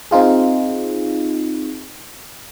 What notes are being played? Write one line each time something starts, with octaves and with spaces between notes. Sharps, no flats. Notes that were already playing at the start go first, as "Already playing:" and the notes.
C4 D#4 F4 G#4